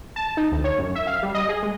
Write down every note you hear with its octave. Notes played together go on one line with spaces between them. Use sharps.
A5
D#4
D2
C#5
F#2
E5
F5
G3
D#5
G#4
G#3